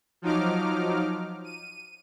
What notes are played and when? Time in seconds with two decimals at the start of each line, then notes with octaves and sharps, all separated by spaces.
0.22 F3 F#3 D#4 D6 F6
1.44 D#7